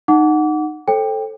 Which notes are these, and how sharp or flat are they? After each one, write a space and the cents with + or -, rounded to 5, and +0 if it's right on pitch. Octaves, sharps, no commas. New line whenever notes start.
D#4 -20 F#5 -5 D6 -30
A4 +0 C5 +40 G5 +15